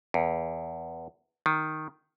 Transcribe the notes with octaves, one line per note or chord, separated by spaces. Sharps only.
E2
D#3